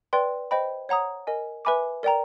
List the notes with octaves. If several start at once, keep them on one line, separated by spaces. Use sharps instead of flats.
B4 D5 G5 C6
C5 D#5 G5 B5
C#5 F#5 A#5 D#6
A#4 D#5 G#5
B4 E5 G#5 B5 D6
A#4 D5 G5 A#5